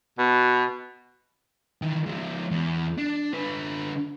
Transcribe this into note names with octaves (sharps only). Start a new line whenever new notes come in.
B2
D#3 E3
F3 G#3
E2
D4
D3 B4